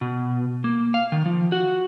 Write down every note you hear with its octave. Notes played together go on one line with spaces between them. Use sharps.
B2
A#3
F5
D#3
F3
F#4